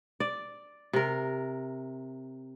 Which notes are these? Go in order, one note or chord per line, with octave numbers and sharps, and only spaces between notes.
D5
C3 A#4